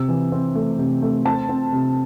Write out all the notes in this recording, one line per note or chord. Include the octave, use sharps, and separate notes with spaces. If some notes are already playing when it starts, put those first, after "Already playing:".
Already playing: C3 E6
E3
C4
A3
C3
A3
C4 A5
C4
C3